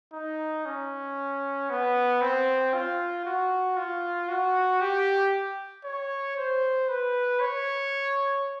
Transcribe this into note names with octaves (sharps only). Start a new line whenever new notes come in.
D#4
C#4
B3
C4
F4
F#4
F4
F#4
G4
C#5
C5
B4
C#5